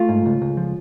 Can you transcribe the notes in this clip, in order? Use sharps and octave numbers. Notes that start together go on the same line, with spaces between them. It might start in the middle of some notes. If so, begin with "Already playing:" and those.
Already playing: A3 F4
G#2
C#2
C#2
F3